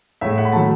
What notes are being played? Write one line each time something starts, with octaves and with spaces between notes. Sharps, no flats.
A2 G#3 E5
F#5
B5
D#3 F#3 A3 A5